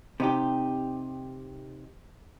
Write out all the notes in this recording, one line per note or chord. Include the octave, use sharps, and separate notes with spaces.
C3 D#4 G4